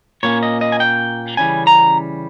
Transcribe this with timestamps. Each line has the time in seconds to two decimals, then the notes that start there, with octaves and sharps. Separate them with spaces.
0.23 A#2 A#3 C#4 C#5
0.43 D#5
0.61 D#5
0.72 G#5
0.80 G5
1.37 C#3 E3 G3 C#4 G#5
1.67 A#5